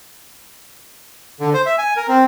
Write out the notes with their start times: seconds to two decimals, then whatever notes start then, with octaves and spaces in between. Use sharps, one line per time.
1.40 D3
1.54 C5
1.66 E5
1.78 G#5
1.97 A#4
2.08 C4